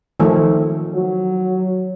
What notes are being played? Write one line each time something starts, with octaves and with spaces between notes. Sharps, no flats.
D#3 F3 A3
F#3